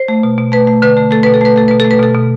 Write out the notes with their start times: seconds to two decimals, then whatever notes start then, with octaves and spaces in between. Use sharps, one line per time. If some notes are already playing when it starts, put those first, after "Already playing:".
Already playing: C5
0.08 A3
0.23 B2
0.38 B2
0.52 A3 B4
0.67 A3
0.82 D3 B4
0.97 A3
1.11 A3 A4
1.23 B2 B4
1.34 A4
1.41 A3 B4
1.56 A3 A4
1.68 B2 B4
1.80 A3 A4
1.91 B4
2.00 B2 A4
2.14 B2